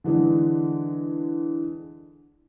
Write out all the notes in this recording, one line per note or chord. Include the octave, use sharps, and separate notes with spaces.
D3 E3 G#3